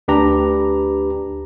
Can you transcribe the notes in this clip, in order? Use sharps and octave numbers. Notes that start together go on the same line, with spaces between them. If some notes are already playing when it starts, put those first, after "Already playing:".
D2 D4 G4 B4 A#5